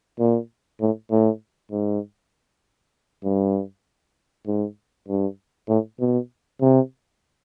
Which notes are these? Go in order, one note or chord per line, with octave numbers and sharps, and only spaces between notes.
A#2
A2
A2
G#2
G2
G#2
G2
A2
B2
C3